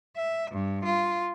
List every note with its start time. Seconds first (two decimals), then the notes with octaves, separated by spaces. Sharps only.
0.16 E5
0.51 G2
0.85 F4